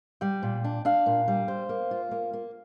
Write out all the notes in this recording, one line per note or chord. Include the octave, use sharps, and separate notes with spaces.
G3 G5
A#2
D4
D4 F5
A#2
G3
C5
A#3
F4
A#3
A#3